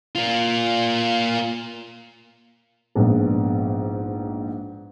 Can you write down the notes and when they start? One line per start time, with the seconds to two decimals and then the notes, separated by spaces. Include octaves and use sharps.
0.15 A#3 F4
2.95 A#1 G#2 B3